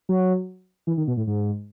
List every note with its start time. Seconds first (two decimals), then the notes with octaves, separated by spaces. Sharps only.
0.09 F#3
0.87 E3
0.97 D#3
1.07 B2
1.17 A2
1.27 G#2